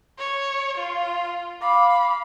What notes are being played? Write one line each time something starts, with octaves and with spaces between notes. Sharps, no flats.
C#5
F4
F5 B5 D6